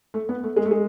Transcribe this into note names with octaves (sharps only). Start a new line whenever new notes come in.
A3
B3
A3
G#3
A3
G#3